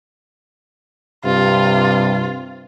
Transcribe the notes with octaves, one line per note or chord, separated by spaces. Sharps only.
G2 C3 F4